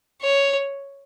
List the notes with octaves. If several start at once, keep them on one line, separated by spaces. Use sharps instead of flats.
C#5